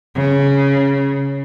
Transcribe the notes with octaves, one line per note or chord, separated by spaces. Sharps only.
C#3